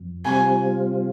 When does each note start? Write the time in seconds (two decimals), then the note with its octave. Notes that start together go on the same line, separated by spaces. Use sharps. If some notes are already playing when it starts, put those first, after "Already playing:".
Already playing: F2
0.25 C3 G3 C4 F4 G#5